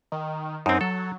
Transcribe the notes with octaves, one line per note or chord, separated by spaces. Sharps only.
D#3
F#2 C4 D#4
F#3 A4